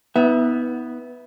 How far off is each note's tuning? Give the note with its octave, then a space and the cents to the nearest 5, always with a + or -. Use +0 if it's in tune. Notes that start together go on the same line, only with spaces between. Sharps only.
B3 +0 D#4 +45 E5 +0